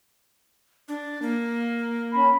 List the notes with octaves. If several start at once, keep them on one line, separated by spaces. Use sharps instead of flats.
D4
A#3
C#4 B5